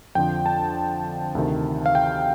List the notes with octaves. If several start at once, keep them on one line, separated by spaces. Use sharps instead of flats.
F2 D3 F3 G5
A5
D2 C3 D#3
F5
G5